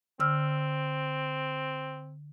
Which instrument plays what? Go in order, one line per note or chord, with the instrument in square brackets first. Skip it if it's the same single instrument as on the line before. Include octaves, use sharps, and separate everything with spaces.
[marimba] D3 E6 F6 [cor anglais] C4